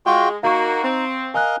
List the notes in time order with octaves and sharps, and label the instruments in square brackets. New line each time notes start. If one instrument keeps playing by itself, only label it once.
[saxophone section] G#3 [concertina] F4 F#4 G5
[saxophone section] A#3 F#4 [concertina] D#4 [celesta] F5 C#6
[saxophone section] C4
[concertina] A#4 D#5 F5 [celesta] G#5 F#6